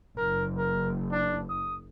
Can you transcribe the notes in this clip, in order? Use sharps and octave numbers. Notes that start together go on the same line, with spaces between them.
F#1 A#4
A#4
D4
D#6